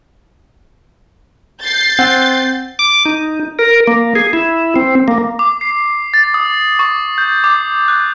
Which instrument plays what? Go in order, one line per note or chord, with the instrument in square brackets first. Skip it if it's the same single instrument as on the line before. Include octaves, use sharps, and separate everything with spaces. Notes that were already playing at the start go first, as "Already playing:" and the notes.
[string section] G6 A6 C7
[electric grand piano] C4 F#5
[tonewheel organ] D6
D#4
A#4
A#3
G#4
E4
C4
A#3
[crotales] D6
C7
A6
D#6
C#6
G6
D6
F#6